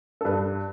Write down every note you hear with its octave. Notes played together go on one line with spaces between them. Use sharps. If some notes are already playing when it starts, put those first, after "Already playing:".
A4
G2 B4